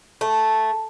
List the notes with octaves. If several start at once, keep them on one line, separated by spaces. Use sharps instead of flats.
A3